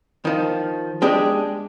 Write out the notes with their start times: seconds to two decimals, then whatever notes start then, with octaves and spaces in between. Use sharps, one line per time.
0.25 D#3 F3
1.02 G#3 D4 G4 G#4